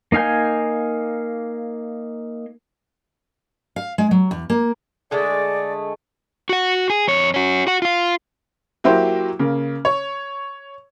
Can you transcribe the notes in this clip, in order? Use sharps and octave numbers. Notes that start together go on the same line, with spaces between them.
A#3 D#4 F5 G#5 G6
F5
G#3
F#3
E2
A#3
D3 G#3 A3 D5
F#4 F#5
G#4
F2 C#5
C#4 F#4
F#4 F#5
F4 F5
F#3 A#3 E4 F#4 G4 C5
C#3 A#3
C#5